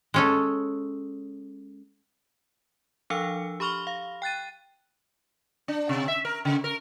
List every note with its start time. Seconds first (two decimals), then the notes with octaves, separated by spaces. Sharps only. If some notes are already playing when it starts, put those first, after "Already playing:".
0.14 G#3 C#4 A4
3.10 F3 D4 A4 F5 E6 C#7
3.60 G4 B5 C#6 F6 F7 G7
3.87 F5
4.22 G5 F#6 A6 D#7
5.68 D4
5.89 C3
6.08 E5
6.25 A#4
6.45 C#3
6.64 A#4